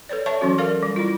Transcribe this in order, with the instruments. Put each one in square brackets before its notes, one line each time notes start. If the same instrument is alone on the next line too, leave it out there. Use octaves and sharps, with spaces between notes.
[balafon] A4 B4 C#5 D5
C#5 D5 E5 A5 C#6
E3 F#3 C#4 F#4
A4 A#4 D5 F5
G3
E4 F4